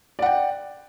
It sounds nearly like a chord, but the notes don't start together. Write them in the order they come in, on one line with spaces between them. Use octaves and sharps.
D5 F#5 G5